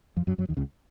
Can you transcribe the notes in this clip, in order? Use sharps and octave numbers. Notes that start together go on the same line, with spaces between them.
F2 F3
F#2 F#3
F#2 F#3
D#2 D#3
C#2 C#3